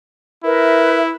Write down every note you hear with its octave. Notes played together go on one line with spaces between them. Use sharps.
E4 A#4 B4 E5